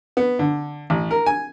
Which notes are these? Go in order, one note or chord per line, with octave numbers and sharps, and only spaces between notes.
B3
D3
A1
A#4
G#5